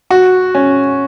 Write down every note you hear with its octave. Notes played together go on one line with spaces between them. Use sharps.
F#4
C#4